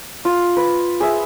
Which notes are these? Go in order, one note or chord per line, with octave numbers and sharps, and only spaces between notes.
F4
B4
G#4 E5